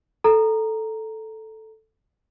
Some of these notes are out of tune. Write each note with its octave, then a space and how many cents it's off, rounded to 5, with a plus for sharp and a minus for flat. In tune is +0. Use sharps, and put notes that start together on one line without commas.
A4 +0 A#5 +0